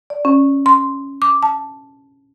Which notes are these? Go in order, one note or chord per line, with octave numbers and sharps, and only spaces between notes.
D5
C#4
C6
D6
A5